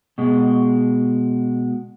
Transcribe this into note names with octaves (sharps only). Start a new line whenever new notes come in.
B2 G#3